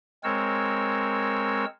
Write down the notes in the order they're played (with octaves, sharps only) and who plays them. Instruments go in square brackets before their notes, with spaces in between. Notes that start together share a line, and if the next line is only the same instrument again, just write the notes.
[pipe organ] G#3 C4 A#4 C#5 E6